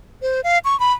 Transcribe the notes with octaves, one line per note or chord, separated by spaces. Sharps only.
C5
F5
C#6
B5